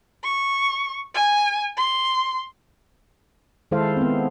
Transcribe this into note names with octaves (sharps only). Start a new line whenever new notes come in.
C#6
G#5
C6
D#3 G#3 E4 A4 C5 F5
B3 C4